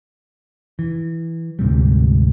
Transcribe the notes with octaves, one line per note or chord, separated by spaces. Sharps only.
E3
D2 G#2 C3 G3